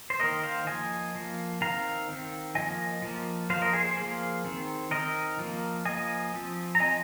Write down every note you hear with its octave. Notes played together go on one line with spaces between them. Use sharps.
C5
D#3 A#3 A#4 D#5
C5 F5
F3 A#3 D#5 G#5
F3 A#3
D#3 C4 F5 A#5
D#3 C4
F3 A#3 D#5 G#5
F3 A#3
F3 A#3 C5 F5
A#4 D#5
G#4 C5
G#4 C5
F3 A#3
D#3 C4
D#3 C4 A#4 D#5
F3 A#3
F3 A#3 D#5 G#5
F3 C4
A#5
F3 C4 D#5 G#5